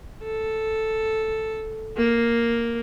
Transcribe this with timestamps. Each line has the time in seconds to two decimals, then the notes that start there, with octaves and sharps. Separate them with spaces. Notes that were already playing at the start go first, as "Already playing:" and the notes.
0.23 A4
1.96 A#3